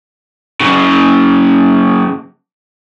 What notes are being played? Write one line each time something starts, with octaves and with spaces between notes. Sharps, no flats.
F#2 C#3